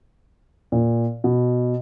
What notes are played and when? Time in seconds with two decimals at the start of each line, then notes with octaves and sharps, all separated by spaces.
0.72 A#2
1.24 B2